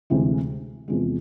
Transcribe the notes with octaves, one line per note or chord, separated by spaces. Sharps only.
D2 C3 E3 G#3
E2 C3 F3 G#3